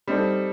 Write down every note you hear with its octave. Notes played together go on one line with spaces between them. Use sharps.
G3 C4 D#4 A4